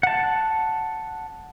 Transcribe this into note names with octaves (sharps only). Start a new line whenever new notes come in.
F#5 A5